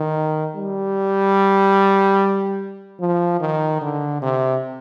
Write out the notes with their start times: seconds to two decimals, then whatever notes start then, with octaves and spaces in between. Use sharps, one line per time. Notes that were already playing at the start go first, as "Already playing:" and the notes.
Already playing: D#3
0.55 G3
3.00 F3
3.40 D#3
3.81 D3
4.22 C3